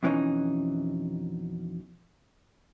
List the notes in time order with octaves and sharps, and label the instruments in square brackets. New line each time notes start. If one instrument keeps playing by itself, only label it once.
[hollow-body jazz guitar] F2 B2 E3 A#3 C#4 D#4